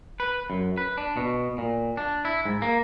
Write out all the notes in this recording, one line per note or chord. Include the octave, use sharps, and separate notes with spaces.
B4
F#2
B4
D4
B2
A#2
D4
E4
G#2
A#3